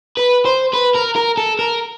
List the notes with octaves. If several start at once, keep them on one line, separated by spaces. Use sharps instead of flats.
B4
C5
B4
A#4
A#4
A4
A#4